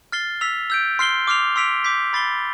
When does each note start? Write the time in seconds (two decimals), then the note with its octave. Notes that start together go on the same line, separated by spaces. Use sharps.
0.12 F6 A6 C7 G7
0.41 E6 B6 F7
0.70 E6 G6 D7
0.99 C6 F6 C7 G7
1.27 D6 F6 C7 F7
1.56 C6 E6 B6 D7 F7
1.84 D6 G6 B6
2.13 B5 D6 A6 C7 G7